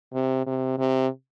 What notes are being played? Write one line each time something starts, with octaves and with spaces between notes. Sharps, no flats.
C3
C3
C3